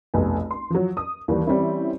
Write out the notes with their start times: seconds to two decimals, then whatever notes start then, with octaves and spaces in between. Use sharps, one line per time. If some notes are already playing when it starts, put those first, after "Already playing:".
0.14 F1 B1 G#5
0.51 C6
0.70 F3 F#3
0.97 D#6
1.28 D#2 E3 G3
1.47 E3 G3 C4 C#4 E4